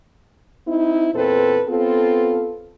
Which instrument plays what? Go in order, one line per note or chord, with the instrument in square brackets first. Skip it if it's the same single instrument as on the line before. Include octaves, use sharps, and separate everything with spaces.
[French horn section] C4 D#4 E4
E2 A#2 C4 A4 B4
B3 C4 F4 A4